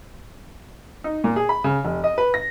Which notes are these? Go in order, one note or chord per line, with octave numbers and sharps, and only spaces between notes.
D#4
A#2
G#4
B5
C#3
F1
D#5
B4
A#6